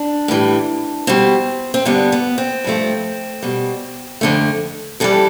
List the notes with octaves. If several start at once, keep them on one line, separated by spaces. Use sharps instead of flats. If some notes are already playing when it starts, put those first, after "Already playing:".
Already playing: D4
A2 E3 G3
B2 G3 C4
C4
G2 D3 G3 B3
B3
C4
G2 F3 A3
B2 G3
F2 D3 A3
F2 E3 G3 A4